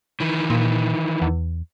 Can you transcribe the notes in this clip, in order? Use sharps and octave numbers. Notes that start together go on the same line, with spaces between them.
D#3 E3
A#2
E2